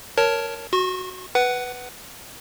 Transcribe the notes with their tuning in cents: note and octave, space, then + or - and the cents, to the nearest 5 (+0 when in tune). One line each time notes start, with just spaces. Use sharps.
A#4 +0 C#5 +5 A5 +0
F#4 +0 C#6 -45
B4 +0 F#5 +15